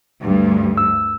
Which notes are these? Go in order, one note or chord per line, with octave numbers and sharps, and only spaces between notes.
D2 G2
E6